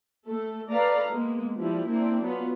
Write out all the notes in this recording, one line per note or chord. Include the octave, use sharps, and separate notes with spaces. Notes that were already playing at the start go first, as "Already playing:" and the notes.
A3 A4
A4 B4 D5 F5 A#5
G#3 A#3 B3
F3 G3 D4 E4
A#3 C4 D4 E4
F#3 B3 F4